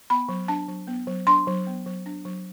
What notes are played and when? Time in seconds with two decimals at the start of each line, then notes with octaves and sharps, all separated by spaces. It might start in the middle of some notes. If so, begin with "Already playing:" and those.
0.10 B3 B5
0.29 F#3
0.48 D4 A5
0.68 F#3
0.87 B3
1.07 F#3
1.27 D4 C6
1.47 F#3
1.67 B3
1.86 F#3
2.06 D4
2.25 F#3